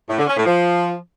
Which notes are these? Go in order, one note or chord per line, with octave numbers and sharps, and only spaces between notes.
A2
D3
C#4
A2
F3